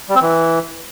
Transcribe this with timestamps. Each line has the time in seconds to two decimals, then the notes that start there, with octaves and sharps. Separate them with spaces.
0.09 G3
0.15 C4
0.22 E3